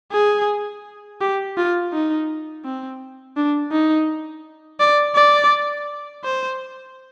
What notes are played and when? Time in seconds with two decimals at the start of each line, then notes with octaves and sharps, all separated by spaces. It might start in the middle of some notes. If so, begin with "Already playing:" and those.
0.12 G#4
1.21 G4
1.57 F4
1.93 D#4
2.65 C4
3.37 D4
3.72 D#4
4.80 D5
5.15 D5
6.24 C5